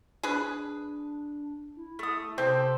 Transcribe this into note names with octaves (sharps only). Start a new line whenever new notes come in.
D4 G#4 B4
E4
A3 D#6
C3 C4 G4 A4 C5